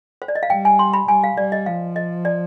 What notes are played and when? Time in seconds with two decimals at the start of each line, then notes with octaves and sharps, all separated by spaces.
0.22 C5
0.28 D5
0.35 D#5
0.43 F5
0.50 G3 G5
0.65 G#5
0.79 C6
0.93 B5
1.08 G3 G#5
1.24 F5
1.37 G3 D5
1.52 D#5
1.66 F3 F5
1.96 D#5
2.25 D5